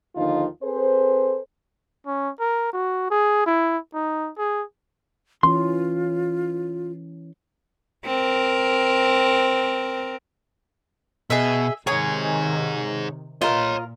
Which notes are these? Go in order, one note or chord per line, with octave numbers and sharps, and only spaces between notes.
D#2 D3 D#3 F3 D#4 F4
C4 G#4 A4 B4 C5
C#4
A#4
F#4
G#4
E4
D#4
G#4
E3 C#4 F4 C6
C4 A#4
B2 G#4 D#5 E5
C3 D#3 D#4 G#4 C#5 G#5 A#5 D#6
A#2 F4 A#4 C#5 D#5 F5 C6